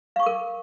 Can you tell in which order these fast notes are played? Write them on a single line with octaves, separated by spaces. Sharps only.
F5 C#6 D6 A#4